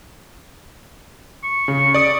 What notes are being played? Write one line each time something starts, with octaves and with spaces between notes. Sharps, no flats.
C#6
C#3
D5 D#6